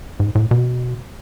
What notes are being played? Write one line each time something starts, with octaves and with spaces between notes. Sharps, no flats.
G#2
A2
B2